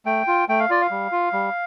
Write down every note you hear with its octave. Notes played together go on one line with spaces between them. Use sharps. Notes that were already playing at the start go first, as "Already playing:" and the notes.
A3 G5
F4
A3 G5
F5
F4 D5
F5
G3
F4
G3